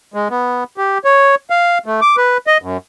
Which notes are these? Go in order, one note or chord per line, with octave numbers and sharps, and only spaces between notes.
G#3
B3
G4
C#5
F5
A3
D6
B4
D#5
F#2